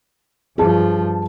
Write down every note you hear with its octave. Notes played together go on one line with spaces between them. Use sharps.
G2 F3 G#4 A5